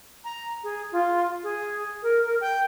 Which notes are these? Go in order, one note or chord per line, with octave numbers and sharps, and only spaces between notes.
A#5
G#4
F4
G#4
A#4
A#4
G5